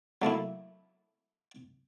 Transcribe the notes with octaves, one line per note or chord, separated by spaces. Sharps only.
F#3 A3 A#3 E4